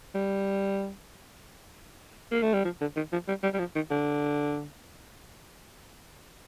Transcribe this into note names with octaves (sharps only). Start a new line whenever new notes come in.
G3
A#3
A3
G3
F3
D3
D#3
F3
G3
G3
G3
F3
D#3
D3